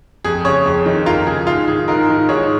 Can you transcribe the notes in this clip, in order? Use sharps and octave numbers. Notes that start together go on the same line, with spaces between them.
F2 G#4
C#3 G#4 C#5
F2
D#3
F2 F4 A#4
C#3 G#4
G#2 F4
D#3 G#4
G#2 F4 A#4
D#3
G#2 G#4 C#5